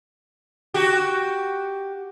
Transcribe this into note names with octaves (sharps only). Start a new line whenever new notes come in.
F#4 G4